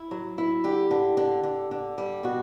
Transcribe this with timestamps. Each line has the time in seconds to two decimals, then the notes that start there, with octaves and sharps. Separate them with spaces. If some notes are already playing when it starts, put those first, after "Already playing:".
Already playing: E4
0.11 F#3
0.38 E4
0.64 D3 G4
0.91 D3
1.17 D3
1.43 D3
1.71 D3
1.98 G3
2.23 B2 F#4